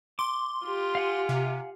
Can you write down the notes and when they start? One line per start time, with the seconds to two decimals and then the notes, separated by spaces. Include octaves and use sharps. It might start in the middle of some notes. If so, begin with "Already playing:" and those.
0.19 C6 D6
0.66 F4 G4
0.95 F5 F#5 G#5
1.29 C3